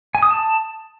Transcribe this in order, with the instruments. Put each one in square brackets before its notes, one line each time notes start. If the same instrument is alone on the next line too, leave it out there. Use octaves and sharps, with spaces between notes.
[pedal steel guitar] G#5
D#6
A5